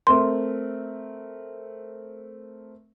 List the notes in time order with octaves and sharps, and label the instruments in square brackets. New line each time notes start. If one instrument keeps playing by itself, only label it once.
[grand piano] A3 C4 A#4 [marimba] C6